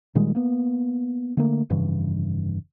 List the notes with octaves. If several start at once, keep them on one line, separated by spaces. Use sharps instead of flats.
A#2 D#3 G3 G#3
A#3 B3
D3 A3 A#3
F1 G2 C#3 E3